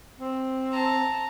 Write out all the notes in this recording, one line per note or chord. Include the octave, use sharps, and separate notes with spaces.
C4
A5 A#5